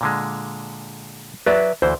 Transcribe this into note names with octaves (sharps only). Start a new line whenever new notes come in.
A#2 D3 G#3
F#3 B4 D5 E5
D2 E3 C5